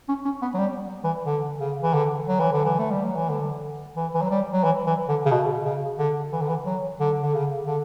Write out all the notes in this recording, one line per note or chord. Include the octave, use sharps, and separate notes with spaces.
C#4
C#4
B3
F#3
G3
E3
D3
C#3
E3
D3
F#3
E3
D3
E3
A3
G3
F#3
E3
D3
E3
E3
F#3
G3
F#3
E3
E3
D3
C#3
B2
C#3
D3
E3
D3
E3
F#3
D3
D3
C#3
D3